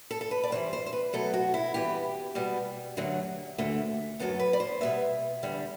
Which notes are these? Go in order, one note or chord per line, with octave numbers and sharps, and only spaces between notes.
A4
A4
B4
D5
G2 E3 G3 C5
C5
C5
B4
B2 F#3 A3 A4
F#4
E4
G2 E3 B3 G4
B2 G3 B3
F#2 D3 F#3 A3
D2 D3 A3
F#2 F#3 B3 A4
B4
D5
C5
B2 G3 B3 E5
E2 D3 G3